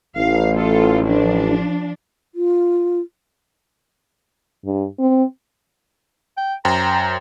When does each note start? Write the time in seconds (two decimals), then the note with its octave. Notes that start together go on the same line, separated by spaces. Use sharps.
0.16 A1 F5
0.53 F4 A4
1.05 F3 D4
2.35 F4
4.65 G2
4.99 C4
6.37 G5
6.65 F#2 C5 G5 A#5